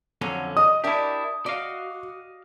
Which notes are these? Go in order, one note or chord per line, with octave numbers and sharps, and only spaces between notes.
F2 D3 F#3 C#4
D#5 D#6
D4 E4 G4 A#4 E5
F#4 D5 D#5 F5